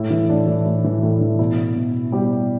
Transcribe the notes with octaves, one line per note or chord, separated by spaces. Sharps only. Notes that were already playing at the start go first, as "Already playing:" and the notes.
Already playing: A2 E4
E3
A2 D4
E3
A2
E3
A2
E3
B2 E4
B2
B2 G3 G4